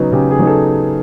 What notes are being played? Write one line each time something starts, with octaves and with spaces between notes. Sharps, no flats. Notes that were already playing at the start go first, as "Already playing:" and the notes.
Already playing: C#3 F#3 B3 D#4
C#3 G4
G#4
F#3 B3 D#4
A4